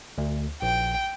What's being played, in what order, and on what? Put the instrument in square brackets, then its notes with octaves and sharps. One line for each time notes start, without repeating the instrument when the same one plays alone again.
[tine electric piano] D2
[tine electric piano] A#1 [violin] G5